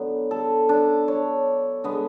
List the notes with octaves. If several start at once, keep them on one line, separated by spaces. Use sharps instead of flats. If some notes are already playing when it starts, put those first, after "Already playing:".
Already playing: D3 F#3 B3
A4
D4
C#5
D3 G#3 B3